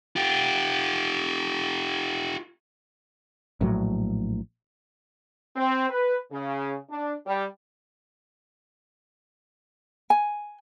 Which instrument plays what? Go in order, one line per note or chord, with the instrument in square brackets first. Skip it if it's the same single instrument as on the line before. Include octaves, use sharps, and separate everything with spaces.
[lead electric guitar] F4 G4
[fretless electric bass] A#1 A2 F#3
[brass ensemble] C4
B4
C#3
D4
G3
[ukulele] G#5